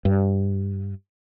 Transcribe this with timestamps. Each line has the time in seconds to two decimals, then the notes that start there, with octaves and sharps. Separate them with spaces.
0.05 G2